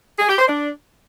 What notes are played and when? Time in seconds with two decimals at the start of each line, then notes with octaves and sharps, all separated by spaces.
0.19 G#4
0.29 G4
0.38 C5
0.48 D4